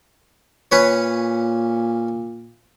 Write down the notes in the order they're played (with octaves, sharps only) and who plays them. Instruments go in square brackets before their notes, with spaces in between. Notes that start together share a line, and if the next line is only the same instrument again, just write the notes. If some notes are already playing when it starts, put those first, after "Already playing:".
[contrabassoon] A#2 [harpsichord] C#4 B4 C#5